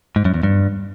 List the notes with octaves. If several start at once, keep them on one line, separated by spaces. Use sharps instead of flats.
G#2
F#2
E2
G2